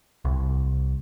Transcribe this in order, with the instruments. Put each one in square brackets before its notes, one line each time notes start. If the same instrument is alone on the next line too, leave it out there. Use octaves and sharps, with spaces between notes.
[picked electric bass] C2